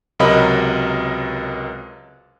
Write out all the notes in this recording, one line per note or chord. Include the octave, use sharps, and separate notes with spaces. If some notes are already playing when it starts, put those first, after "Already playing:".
C#2 C3 F#3 A#4 D#5 B5